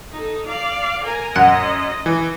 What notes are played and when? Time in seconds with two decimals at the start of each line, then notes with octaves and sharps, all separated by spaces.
0.12 D#4 A4
0.47 D5 F5
1.04 A#4 G#5
1.36 F#2 D#5 F#5
2.06 E3